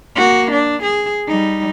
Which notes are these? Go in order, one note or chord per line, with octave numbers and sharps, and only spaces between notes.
A#3 F#4
D4
G#4
G3 D#4